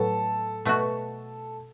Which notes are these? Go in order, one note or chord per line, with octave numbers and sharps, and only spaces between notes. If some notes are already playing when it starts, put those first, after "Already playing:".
Already playing: A2 F#3 B3 A4
B2 A3 F#4